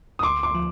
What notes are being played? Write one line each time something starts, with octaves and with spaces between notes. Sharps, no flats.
D#6
D2 C6 D6
C6 D6
F3